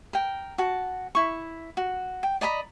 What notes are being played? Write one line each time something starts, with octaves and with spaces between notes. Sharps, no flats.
A#4 G5
F#4 A5
E4 C#6
F#4
G5
D5 D#5 A#5 B5